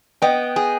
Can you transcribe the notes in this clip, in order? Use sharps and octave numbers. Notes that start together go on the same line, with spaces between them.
B3 D#5 G5
G#4